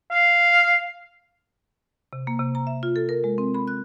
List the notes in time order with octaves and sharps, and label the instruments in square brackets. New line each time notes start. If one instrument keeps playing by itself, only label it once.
[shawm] F5
[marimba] C3
A#3
C3
A#5
E5
F4
A4
A#4
G#3
C4
B5
F#6